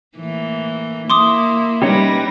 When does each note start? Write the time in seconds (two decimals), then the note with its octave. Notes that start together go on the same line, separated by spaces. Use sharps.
0.17 A2 E3 A#3
1.10 A#3 E4 C6 D6 D#6
1.82 G3 C#4 D#4 G4 B4 A#6